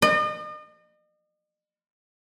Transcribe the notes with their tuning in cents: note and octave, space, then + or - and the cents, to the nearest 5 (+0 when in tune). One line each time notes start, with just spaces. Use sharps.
D#5 -40